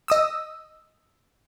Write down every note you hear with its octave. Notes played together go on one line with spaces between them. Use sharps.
D#5 D#6 E6